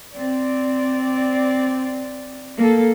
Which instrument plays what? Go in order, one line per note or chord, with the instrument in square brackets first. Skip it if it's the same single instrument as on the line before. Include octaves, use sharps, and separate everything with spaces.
[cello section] C4 D5
A#3 A4